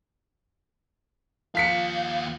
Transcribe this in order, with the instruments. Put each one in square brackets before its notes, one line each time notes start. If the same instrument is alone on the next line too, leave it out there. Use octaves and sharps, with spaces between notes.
[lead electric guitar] D#2 F5 [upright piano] F3 B6 C#7